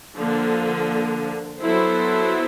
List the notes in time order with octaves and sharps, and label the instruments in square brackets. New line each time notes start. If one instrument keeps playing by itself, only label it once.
[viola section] D3 F3 A#3 D4
F#3 B3 E4 A4 C5